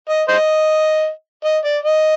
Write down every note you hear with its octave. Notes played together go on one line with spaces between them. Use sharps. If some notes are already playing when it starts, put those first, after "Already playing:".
D#5
C5 D#5
D#5
D5
D#5